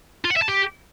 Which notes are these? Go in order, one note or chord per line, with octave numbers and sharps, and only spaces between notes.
F4
F#5
E5
A5
G4